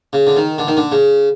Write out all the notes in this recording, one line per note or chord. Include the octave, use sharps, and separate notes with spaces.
C#3
D3
D#3
D3
D#3
D3
C#3